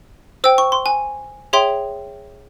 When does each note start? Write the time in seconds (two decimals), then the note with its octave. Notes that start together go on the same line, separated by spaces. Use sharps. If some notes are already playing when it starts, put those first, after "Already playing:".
0.44 C5 G5 E6
0.58 C#6
0.72 C6
0.86 G#5
1.53 G#4 C#5 E5 G5 C6